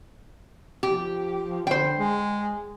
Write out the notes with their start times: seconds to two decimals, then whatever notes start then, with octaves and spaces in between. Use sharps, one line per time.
0.83 F3 G4
1.67 D3 C5 G5
1.97 G#3